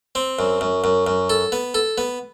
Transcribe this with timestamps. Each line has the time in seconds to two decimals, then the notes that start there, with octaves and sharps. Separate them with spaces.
0.15 C4
0.39 F#2
0.61 F#2
0.84 F#2
1.07 F#2
1.30 A4
1.52 B3
1.74 A4
1.98 B3